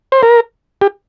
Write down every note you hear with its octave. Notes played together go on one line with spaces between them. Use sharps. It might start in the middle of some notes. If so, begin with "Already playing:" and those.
C5
A#4
G4